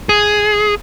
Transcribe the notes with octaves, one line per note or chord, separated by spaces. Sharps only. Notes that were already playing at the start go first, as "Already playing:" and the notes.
G#4